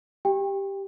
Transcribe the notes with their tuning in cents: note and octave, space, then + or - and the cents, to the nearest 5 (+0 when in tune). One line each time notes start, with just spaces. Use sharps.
G4 +0 G5 +25